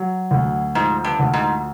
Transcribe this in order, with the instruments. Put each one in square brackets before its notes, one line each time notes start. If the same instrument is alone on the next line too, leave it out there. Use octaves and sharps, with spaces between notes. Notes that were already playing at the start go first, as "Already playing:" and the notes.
Already playing: [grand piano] F#3
D2
[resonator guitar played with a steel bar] G#2 [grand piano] F3
[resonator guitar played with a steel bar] G2
[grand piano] D2
[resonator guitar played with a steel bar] G#2